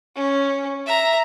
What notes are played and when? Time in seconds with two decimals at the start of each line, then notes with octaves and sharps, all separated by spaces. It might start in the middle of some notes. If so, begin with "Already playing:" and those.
0.15 C#4
0.86 E5 A#5